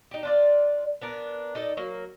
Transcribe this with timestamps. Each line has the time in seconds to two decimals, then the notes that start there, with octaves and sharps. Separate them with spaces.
0.11 D#4 G4
0.23 D4 F4 D5
1.01 B3 D4 A#4
1.55 D#4 A4 D5 D#5
1.77 F#3 A#3